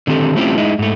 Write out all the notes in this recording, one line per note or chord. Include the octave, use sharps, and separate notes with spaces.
D3 D#3 C4 G4 A4
A3 C4 C#4 E4 F4 G4
G#3 D#4 E4
G#2 A3